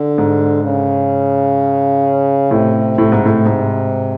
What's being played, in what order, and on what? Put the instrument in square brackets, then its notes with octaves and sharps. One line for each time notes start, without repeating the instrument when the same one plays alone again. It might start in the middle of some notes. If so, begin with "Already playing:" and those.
Already playing: [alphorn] D3
[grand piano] G#2
[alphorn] C#3
[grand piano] A2 [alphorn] C3
[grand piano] A2
G#2
A2
G#2